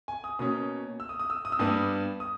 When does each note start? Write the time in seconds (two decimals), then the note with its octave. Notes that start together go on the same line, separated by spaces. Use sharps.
0.08 G#5
0.24 D#6
0.39 B2 A#3 C#4 D#6
1.00 E6
1.09 D#6
1.19 D#6
1.30 E6
1.45 D#6
1.52 E6
1.59 G2 G3 B3 D#6
2.20 D#6